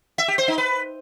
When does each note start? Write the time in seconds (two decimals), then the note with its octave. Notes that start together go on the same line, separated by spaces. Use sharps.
0.18 E5
0.28 G4
0.38 C5
0.48 D#4
0.58 B4